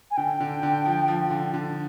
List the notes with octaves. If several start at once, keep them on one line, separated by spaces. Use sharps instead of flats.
G#5
D3 G5
D3
D3
F3
F3
D3
D3